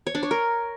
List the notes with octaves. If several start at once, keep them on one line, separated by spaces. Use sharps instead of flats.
C#5
D4
C#5
A#4